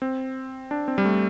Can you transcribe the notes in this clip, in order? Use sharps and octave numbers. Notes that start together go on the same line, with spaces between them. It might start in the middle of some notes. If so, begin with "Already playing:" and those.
C4
D4
C4
G3
A3